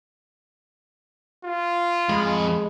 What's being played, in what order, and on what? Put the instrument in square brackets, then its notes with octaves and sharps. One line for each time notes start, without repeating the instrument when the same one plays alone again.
[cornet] F4
[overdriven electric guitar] F2 B5 [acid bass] G#3